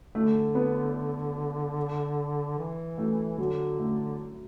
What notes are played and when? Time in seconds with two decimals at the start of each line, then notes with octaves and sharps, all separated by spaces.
0.15 D3 A3
0.55 B3
2.58 E3
2.98 A3
3.38 D3 F#3
3.79 A3